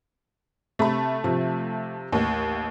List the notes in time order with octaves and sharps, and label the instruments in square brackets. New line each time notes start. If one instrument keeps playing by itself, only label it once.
[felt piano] C3 B5 [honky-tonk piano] A3
[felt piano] C3 F3
[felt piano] A1 [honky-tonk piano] D#2